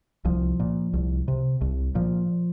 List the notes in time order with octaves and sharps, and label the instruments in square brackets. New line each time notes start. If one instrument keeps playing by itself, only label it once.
[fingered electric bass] C2 F3
A#2
C2
C3
C2
A#2 F3